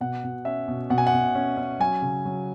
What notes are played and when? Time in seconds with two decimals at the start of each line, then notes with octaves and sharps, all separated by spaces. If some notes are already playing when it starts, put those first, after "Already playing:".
0.01 B2 F#5
0.24 B2
0.45 C#4 E5
0.68 B2
0.90 B2 F#5
0.98 G#5
1.07 F#5
1.13 B2
1.35 C#4
1.57 C#4
1.80 F#3 G#5
2.02 C#3
2.25 F#3